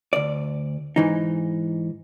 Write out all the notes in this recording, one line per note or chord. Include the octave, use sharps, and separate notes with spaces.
D2 D5
G#2 E3 D#4